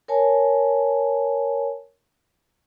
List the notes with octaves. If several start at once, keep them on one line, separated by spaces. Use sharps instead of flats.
A#4 C#5 G#5 A5